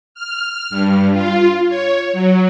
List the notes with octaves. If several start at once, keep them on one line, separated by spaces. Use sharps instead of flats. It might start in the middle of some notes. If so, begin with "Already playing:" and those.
F6
G2
F4
C#5
F#3